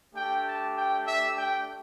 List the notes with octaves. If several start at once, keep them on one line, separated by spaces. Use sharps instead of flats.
A3 D4 G4 G5
A5
G5
E5
G5